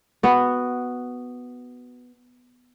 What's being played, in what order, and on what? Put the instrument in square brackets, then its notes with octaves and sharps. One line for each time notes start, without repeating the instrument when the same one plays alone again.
[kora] B3 F#4